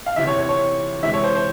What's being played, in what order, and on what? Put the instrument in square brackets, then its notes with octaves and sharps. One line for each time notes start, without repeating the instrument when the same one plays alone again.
[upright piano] F5
E2 C3 E3 E5
C#5
C#5
C#5
C3 E3 G#3 E5
C#5
C5
C5